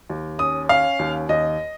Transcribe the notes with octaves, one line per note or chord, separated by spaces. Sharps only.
D#2
C#4 D#6
C#4 F5
D#2
D#2 D#5